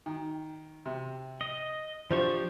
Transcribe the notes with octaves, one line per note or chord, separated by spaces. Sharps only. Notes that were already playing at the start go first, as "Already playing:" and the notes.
D#3
C3
D#5
F3 D4 F4 G4 C5 C#6